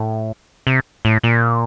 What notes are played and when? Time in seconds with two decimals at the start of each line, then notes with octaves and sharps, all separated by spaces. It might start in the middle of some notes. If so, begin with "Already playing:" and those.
Already playing: A2
0.67 C3
1.05 A2
1.23 A#2